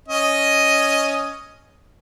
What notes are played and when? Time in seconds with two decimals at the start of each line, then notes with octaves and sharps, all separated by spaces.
0.09 C#4 D#5